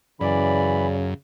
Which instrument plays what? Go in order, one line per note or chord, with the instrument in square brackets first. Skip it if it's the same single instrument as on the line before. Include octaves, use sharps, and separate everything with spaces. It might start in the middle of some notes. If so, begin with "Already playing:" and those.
[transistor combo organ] F#2 [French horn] C#3 [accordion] E3 B5 [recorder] D5